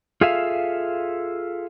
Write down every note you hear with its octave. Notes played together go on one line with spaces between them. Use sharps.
F4 G#4 A4 E5 F5